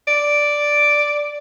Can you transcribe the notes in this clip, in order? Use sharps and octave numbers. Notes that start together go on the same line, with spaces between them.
D5